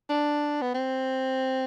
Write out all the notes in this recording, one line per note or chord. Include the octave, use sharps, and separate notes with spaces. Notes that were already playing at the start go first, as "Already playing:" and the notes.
D4
B3
C4